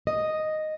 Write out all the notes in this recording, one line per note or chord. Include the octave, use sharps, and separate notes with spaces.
D#5